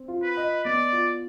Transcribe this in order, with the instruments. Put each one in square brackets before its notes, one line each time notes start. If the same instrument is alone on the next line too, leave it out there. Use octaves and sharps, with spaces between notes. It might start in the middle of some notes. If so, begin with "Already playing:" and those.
Already playing: [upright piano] C4
F4
[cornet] B4
[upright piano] D#5
[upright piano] B3 [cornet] D5
[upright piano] F4